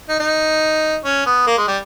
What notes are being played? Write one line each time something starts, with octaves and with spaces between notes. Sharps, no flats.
D#4
D#4
C#4
B3
A#3
G#3
G3